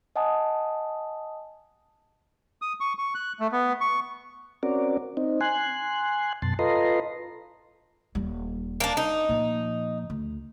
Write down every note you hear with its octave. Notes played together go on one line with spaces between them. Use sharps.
D#5 F#5 G#5 A5 D#6
D#6
C#6
C#6
F#6
A3
B3
C#6
C4 C#4 F#4 A#4 D5
C4 D#4
G#5 C6 F#6
F#2 B2 A5 C6
F4 A4 B4 D#5 A#5 C6
D#1 G3
A#3 D4
D#4
A#2 F3
D2